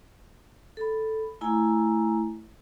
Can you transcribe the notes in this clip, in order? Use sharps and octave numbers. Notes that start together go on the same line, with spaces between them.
A4 B5
A3 E4 G#5 A#5